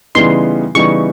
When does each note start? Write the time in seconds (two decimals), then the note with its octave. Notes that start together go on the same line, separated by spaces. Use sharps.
0.15 C#3 E3 G3 B3 D#4 C6
0.75 C#3 E3 G3 B3 D#4 C#6